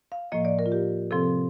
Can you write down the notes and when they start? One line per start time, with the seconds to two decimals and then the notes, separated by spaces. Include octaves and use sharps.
0.12 F5
0.32 A2 F3 A#3 D#5
0.45 D5
0.59 A#4
0.66 F4
0.72 G4
1.11 C3 F3 C4 A4